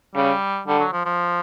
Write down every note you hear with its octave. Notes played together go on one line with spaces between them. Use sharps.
C#3 G3
D3 G3
F#3
F3
F3